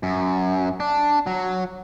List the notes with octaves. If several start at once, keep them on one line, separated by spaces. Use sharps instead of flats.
F#2
D4
F#3